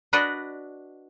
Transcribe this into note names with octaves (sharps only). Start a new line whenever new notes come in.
D4 F#4 B4 D5 D#5